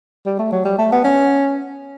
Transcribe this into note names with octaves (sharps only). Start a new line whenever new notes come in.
G3
A3
F#3
G3
A3
B3
C#4